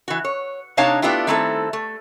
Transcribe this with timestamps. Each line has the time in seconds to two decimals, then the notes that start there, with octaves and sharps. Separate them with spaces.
0.08 E3 F#4
0.25 C#5
0.77 C3 D4 D#4 C#5 F5 A5
1.02 A3 B3 D4 E4 F4 G4
1.27 D#3 G3 A3 C4 E4 A4
1.73 A3